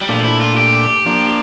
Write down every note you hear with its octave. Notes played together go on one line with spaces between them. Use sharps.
G3
A#2 F3 A3 D4
E4
F4
G4
F3 A#3 D4